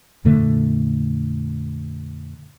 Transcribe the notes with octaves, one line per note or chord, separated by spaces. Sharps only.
F2 A#2 D3 A3